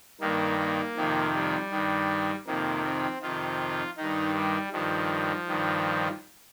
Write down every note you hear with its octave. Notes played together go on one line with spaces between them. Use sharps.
G2 D#3 A#3
A#3
F2 C3 D#3
G3
G2 D#3
F2 C3 D#3 A#3
C4
F2 C3 D#3 F4
G2 D#3 D#4
G3
G2 D#3 F3
G2 D#3